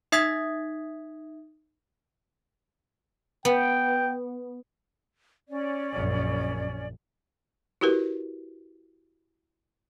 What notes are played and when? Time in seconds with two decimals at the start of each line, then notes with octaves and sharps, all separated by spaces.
0.12 D#4 E5 D#6 G#6 B6
3.45 B3 G5
5.48 C#4 D5
5.92 A#1 F#2
7.81 E4 F#4 G4 A#4 B4